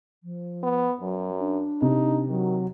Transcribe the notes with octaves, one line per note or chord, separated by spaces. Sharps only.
F3
B3
F#2 F#3
D4
C3 D#4
D#3 F#3